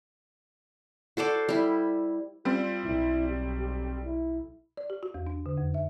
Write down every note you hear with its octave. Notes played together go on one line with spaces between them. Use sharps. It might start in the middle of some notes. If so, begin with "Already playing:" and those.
F#4 A4 C5 D5
G3 E4
G3 C4 F4
B1 E4
G4
G4
E4
D5
G4
F#4
E2
D4
D3
F2
E5